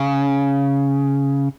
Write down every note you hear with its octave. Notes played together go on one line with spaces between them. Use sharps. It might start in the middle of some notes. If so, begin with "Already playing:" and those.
Already playing: C#3